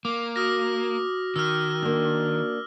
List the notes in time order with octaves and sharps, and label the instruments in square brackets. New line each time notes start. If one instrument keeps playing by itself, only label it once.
[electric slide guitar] A#3 [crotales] D6
[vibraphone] F#4 [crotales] D#6 F6 A#6
[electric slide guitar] D#3 [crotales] E6 F6
[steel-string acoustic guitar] A#3 D4